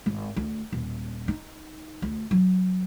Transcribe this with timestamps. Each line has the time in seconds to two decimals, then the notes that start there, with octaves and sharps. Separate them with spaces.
0.06 G#1
0.36 D2
0.72 D#1
1.28 D#4
2.02 D2
2.31 F#3